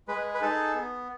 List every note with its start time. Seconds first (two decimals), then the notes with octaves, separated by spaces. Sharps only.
0.08 G#3 B4
0.34 B4
0.41 D#4 G#4 A4
0.75 B3